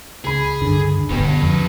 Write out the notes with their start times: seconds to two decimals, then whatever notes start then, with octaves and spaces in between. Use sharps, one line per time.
0.25 C#2 G#4 B5
0.62 G2 D3
1.10 G1 B2 D3 G4 B4
1.41 F2